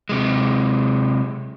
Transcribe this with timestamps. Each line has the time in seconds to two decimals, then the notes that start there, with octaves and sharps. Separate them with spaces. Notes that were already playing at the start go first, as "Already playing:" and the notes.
0.09 C3 G#3